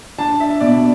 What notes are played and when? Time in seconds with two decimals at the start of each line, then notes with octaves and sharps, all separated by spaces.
0.18 D4 A5
0.40 E5
0.61 B2 D5